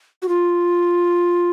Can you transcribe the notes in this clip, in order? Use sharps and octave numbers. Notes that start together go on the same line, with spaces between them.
F#4
F4